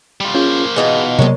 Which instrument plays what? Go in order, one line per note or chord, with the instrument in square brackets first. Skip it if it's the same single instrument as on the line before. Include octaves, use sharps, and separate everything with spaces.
[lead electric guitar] G3 F4
[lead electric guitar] A#3 C5 [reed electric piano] C#4 F4 G#4
[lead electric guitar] B2 [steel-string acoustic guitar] E3 D#4 F4 [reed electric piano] G#4 D#5
[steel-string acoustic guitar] D2 G#3 [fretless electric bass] C3 F#3 A#3 [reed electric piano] A#4 C#5